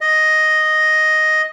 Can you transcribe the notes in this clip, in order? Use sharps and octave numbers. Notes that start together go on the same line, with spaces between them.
D#5